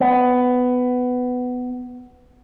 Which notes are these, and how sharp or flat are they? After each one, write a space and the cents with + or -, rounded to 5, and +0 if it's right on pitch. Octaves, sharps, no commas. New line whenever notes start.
B3 +15